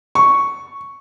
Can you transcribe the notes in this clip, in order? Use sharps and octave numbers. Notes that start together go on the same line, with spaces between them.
C#6